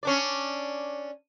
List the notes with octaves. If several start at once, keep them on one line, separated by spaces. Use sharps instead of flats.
C#4 D4 D5